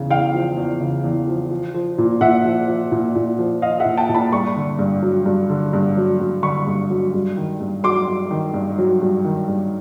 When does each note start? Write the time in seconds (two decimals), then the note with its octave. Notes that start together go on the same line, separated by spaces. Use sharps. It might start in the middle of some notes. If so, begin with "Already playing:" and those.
Already playing: E2 C#3
0.10 E2 F5 G5
0.34 F3
0.57 E2
0.81 C#3
1.04 E2
1.28 F3
1.51 F3
1.74 F3
1.98 A#2
2.21 A#2 E5 F#5
2.45 F3
2.68 F3
2.92 A#2
3.16 A#2
3.39 F3
3.62 F3 D#5 F5
3.80 E5 F#5
3.86 A#2
3.97 G5 A5
4.09 A#2
4.14 A5 B5
4.32 G2 B5 C#6
4.56 D3
4.79 G2
5.02 F#3
5.26 G2
5.50 D3
5.73 G2
5.97 F#3
6.20 G2
6.43 D3 B5 C#6
6.67 G2
6.90 F#3
7.14 G2
7.37 D#3
7.61 G2
7.83 F#3 C6 D6
8.08 G2
8.31 D#3
8.54 G2
8.78 F#3
9.01 G2
9.25 D#3
9.48 G2